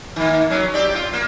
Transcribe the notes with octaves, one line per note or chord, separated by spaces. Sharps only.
D#3 A#3
F#3 C#4
C4 G4 D5
F4
A#3